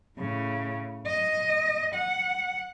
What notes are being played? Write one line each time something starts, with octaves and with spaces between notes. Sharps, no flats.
A2 C#3
D#5
F#5